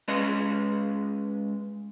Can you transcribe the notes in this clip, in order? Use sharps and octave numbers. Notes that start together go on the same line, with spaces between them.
G#3 C#4 B4 D#5